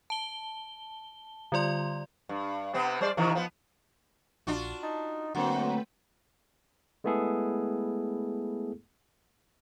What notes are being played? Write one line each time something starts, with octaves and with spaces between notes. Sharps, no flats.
A5 G7
D3 G3 F4 D5 C6
G2
C3 B3 C4
G3 C5 D5
C3 D#3 E3
F3 B3
A#1 D4 F4 F#4
D#4 A5
F#2 D3 A3 A#3 C4 F#4 B4 G5
G#3 A3 B3 E4 G#4 A4